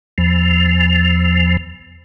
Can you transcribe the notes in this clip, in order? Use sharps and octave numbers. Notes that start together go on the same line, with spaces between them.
E2 F3